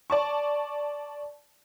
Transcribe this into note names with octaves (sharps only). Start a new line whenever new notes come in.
D5 A5 C#6